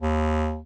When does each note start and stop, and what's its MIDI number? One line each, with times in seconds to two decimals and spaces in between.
0.02 0.60 39